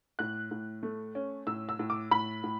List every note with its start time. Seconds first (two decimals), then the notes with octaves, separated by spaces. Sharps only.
0.19 A2 F#6
0.51 A2
0.83 A3
1.15 C#4
1.47 A2 E6
1.69 E6
1.79 A2
1.90 D6
2.11 A2 B5
2.44 A2